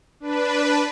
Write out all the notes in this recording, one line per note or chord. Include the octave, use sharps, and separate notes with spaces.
D4 B4